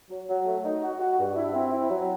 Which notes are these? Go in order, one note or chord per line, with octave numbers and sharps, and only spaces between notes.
F#3
F#3
A3
D#4
F#4
F#4
G2
E4
C4
E4
F#3